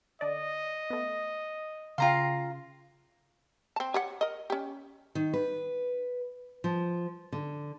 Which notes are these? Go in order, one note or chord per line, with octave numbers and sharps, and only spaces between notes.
D3 D5 D#5
A3 B3
C#3 F4 F5 G5 A#5 C6
C4 A5
G4 C#5 F#5
A#4 D#5
C#4 G4
D#3
B4
F3
D3